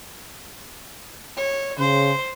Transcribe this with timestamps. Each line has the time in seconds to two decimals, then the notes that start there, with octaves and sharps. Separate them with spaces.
1.37 C#5
1.79 C#3 C5